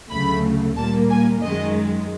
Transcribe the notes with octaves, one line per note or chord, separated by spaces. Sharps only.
D2 C#3 F#3 A3 B5
A#2 G3 A#3 A5
G#5
F#2 D#3 G#3 D#5